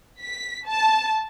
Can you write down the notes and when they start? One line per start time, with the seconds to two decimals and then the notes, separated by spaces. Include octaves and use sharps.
0.21 B6
0.67 A5